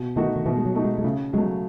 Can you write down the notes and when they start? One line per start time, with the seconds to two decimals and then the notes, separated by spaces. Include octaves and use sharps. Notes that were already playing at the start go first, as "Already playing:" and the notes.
Already playing: B2
0.16 D#3 A3 D#4 F#4
0.36 D#3
0.46 B2 E3
0.57 G#3
0.66 F#3
0.75 A3 D#4 F#4
0.85 G#3
0.98 G#3
1.04 C#3 A3
1.33 F#3 G#3
1.38 A3